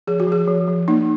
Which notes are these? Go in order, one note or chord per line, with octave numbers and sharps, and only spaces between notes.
F3 G#4
F#4
F3 G#4
F3
F3
A#3 D#4